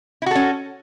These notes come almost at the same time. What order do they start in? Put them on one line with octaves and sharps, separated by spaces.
E4 F#4 A4 C#4